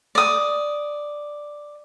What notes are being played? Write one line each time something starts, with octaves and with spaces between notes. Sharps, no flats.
D5 D#6